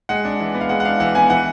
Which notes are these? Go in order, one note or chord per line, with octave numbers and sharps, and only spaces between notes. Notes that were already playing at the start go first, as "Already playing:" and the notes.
G#3 F#5
D4
E3
B3
F5
G#3 F#5
F#5
D4 F5
E3 F#5
B3 G#5
E3 F#5